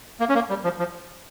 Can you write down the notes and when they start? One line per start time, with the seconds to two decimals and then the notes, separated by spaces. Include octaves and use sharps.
0.20 A#3
0.29 C#4
0.35 A#3
0.50 G3
0.64 F3
0.79 F3